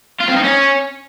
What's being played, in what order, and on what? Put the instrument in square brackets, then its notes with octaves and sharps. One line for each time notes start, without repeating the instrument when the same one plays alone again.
[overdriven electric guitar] F4
C4
D#4
C#4